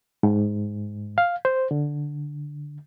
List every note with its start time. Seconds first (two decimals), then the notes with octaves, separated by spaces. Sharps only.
0.23 G#2
1.18 F5
1.45 C5
1.71 D3